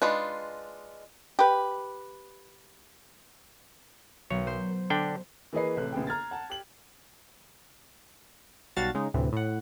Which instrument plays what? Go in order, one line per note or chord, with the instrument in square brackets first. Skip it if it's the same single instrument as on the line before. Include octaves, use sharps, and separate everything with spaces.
[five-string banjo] G#3 D4 D#4 F4 B4
[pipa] G4 B4
[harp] B1 [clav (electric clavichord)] C#5
[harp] C5
[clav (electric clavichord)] D3 D4 G5
[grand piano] E3 A#3 G#4 B4 D#5 C7
A1 C3 A4 F#6
A#1 C#3 B3 G#4 G5
A#5 F6 G#6 A6
F#5 A5
G4 F#7
[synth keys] B1 G3 F#4 F5 A5 A6
C#3 G#3 D#4
D2 A2 C3 E3
A2 F#5